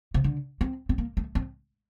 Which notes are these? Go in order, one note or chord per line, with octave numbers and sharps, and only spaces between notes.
C3
D3
C4
C4
A#3
A3
C4